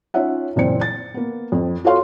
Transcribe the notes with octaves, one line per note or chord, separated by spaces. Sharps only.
C#4 D#4 F4 C#5 E5 F#5
F#1 A#2 E3 C4 C#7
A6
A#3 B3
F2 C4
F4 F#4 A4 C#5 F5 C6